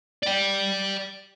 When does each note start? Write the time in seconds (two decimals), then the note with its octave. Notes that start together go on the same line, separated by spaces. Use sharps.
0.23 D5 G5